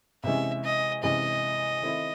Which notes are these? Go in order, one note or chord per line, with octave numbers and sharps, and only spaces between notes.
C3 E3 G#3 C#4 E5
D#5
C3 E3 G#3 C#4 D#5
D#3 A3 C4 E4